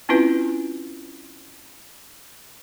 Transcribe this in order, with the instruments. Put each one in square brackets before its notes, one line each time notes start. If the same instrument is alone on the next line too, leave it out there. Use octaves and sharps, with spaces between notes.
[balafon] C4 C#4 E4 F4 B4